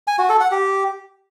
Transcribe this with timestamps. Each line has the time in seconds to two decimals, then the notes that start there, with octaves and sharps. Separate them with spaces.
0.07 G#5
0.18 F#4
0.29 A4
0.40 F#5
0.51 G4